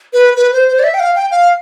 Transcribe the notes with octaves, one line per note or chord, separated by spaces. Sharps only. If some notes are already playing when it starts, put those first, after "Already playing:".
B4
B4
C5
C5
D5
E5
G5
F5
G5
F5